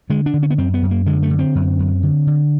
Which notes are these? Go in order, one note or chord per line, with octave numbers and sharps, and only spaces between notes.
D3 G#3
D4
D3
C#4
B3
F#2 C4
B3
F#2
A#3
D3 G#3
A3
D3
C4
F#2
F#2
D3
D3